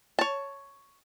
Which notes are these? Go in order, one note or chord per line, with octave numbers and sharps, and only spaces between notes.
C#5 A5